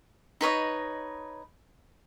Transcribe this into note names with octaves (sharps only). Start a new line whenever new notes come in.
D#4 B4 C#5 D#5